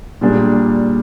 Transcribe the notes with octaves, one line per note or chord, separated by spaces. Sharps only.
A#2 G3 D4 G#4